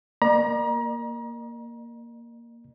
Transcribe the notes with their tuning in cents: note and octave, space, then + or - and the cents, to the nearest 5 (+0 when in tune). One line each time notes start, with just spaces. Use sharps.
A#3 +0 D5 +45 A#5 +35